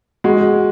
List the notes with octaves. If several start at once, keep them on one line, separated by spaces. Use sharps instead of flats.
G#3 F#4